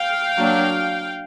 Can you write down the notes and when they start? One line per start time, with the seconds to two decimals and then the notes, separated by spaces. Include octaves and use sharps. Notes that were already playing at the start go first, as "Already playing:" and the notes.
Already playing: F5 G5
0.37 F#3 A#3 D4